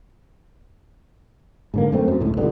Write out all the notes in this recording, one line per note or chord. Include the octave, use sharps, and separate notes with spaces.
G#2 D3 A#3
F#2 A3 C4
F#2
C#2 A2
E1 C#2 G2 D3